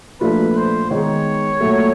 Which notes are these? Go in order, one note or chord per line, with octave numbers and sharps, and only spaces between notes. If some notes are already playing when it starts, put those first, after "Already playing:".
A#2 F3 A3 D4 F4 B4
C5
D#3 G#3 B3 D#4 C#5
A#2 F#3 A3